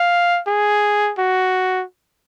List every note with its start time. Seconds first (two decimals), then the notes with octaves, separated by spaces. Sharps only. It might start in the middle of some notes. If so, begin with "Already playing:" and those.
Already playing: F5
0.47 G#4
1.18 F#4